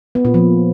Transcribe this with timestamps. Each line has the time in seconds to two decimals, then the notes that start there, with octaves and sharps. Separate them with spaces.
0.15 B3
0.25 A#2
0.34 F3